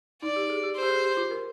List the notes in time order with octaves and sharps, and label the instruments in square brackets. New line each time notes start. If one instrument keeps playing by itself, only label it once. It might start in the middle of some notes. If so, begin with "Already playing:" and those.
[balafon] D#4 [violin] D5
[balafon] G4
G#4
G4
[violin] C5
[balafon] G4
G#4
G4
F4
A#4